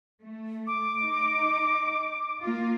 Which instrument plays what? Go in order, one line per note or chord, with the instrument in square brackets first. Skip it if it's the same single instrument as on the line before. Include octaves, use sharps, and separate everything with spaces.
[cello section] A3
[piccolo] D6
[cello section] D#4
A#3 F4